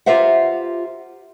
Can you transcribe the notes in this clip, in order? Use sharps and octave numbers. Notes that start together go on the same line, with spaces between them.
F4 G4 A#4 C5 E5 F#5